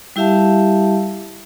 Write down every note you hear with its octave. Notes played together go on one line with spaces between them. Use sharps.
G3 E4 G4 E5 F5 A5